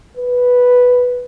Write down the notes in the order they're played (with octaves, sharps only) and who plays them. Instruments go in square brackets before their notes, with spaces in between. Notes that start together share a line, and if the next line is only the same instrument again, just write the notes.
[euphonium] B4